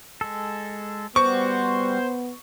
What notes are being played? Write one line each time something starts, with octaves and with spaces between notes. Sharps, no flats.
G#3 A4
G3 B3 F#4 C5 C#6 D6